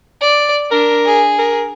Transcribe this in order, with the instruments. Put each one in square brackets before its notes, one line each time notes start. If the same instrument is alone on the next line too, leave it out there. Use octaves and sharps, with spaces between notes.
[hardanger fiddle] D5
[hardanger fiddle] D4 [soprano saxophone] A#4
[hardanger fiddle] G#4
[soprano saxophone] A#4